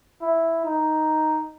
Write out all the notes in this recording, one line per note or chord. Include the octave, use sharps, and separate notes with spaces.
E4
D#4